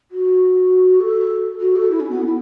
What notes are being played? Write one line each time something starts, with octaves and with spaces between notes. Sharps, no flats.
F#4
A4
F#4
A4
E4
C#4
B3
E4